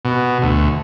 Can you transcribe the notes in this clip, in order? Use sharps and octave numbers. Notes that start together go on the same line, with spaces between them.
B2
D2